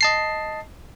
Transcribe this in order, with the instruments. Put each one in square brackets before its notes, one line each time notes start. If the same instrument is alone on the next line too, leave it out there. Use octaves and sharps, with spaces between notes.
[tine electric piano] D#5 A5 C7